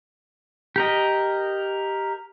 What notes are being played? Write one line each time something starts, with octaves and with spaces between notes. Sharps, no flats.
G4 A#4 D#5